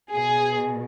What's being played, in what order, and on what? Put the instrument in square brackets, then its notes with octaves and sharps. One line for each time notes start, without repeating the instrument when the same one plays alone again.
[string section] B2 G#4